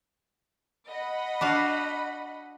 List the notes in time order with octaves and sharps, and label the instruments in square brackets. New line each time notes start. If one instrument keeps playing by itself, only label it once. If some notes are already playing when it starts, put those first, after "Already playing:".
[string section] D#5 F#5 B5
[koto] D4 F#4 F5